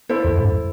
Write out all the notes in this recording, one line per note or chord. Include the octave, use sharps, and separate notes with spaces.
E4 A4 C5
E2
G2